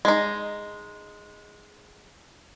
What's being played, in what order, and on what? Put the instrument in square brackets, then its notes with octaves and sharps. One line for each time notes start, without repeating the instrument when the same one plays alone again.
[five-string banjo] G#3 D#4